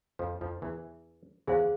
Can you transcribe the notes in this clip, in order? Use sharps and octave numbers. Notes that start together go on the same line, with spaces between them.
F2 F3
F2 F3
E2 E3
E2 E3 G#4 C5 F5